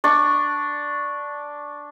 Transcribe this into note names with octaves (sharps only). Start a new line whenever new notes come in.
D4 C#6